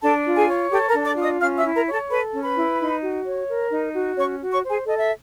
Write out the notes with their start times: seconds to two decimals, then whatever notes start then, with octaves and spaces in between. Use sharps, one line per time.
0.01 D4 A4 A5
0.25 F4
0.36 G#4 G#5
0.48 C#5
0.70 G4 A4 G5
0.88 A#4 A#5
0.94 D4
1.05 D5 D6
1.17 F4
1.22 D#5 D#6
1.40 C#4 F5 F6
1.58 E5 E6
1.63 E4
1.75 A#4 A#5
1.86 C#5
1.92 A4 A5
2.09 A4 B4 B5
2.33 C#4
2.44 B4 B5
2.56 E4
2.79 D#4
3.02 F#4
3.25 C#5
3.48 A#4
3.71 D#4
3.94 F#4
4.17 C#4 C#5 C#6
4.40 F#4
4.52 C#5 C#6
4.64 C5
4.69 G#4 G#5
4.87 A4 D#5
4.99 E5